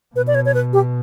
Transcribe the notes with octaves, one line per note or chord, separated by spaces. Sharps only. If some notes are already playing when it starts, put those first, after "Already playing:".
B2 B4
D5
C#5
C#5
B4
G4